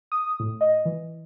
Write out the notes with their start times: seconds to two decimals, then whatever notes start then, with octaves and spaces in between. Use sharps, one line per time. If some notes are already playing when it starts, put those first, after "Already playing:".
0.12 D#6
0.40 A2
0.61 D#5
0.85 E3